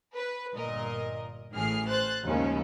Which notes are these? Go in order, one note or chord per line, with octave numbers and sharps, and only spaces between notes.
B4
G1 A#2 A#4 D#5
A1 A2 E3 G#4 F6 C7
C5 F#6 A6
D#2 G#2 C#3 F3 C#4 E4